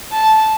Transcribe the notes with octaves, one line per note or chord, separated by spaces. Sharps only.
A5